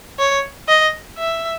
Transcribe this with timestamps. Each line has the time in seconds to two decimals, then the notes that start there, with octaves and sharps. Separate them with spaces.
0.19 C#5
0.68 D#5
1.18 E5